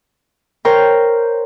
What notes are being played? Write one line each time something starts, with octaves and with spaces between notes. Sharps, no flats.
A#4 C5 C#5 G5